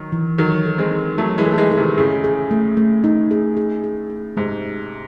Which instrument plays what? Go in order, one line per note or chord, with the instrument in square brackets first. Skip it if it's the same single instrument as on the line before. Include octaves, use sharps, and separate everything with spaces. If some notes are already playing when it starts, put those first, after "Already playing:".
Already playing: [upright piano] D#3 F#3
[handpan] E3
[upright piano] D#3 F#3 [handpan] A4
[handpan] A4
[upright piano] G#3 C4
[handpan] D#4
[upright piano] F#3 A3 [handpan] A4
[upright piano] E3 G#3
[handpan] A4
[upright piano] A3
E3 G#3
[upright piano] E3 [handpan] A4
[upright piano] C3 D#3
[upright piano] A2 C#3 [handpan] G#4
[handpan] G#4
A3
A3
D#4
G#4
G#4
G#4
G#4
[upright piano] G#2 C3 [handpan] G#3